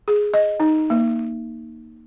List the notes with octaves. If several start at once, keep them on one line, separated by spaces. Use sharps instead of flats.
G#4
D#5
D#4
A#3